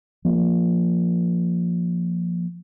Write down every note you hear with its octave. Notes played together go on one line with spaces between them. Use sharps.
F3 A#3